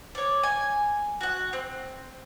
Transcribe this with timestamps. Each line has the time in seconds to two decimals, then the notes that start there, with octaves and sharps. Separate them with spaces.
0.15 C#5 D5
0.43 G#5
1.21 F#4 F#5
1.53 C4